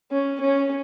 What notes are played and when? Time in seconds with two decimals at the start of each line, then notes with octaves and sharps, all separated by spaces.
0.11 C#4
0.41 C#4